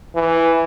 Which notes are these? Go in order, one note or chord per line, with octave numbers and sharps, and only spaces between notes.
E3